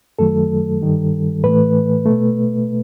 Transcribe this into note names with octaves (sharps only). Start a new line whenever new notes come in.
F#2 D#3 F#3 A3 A4
G2 D#3 G3
A2 E3 A3 B4
B2 A3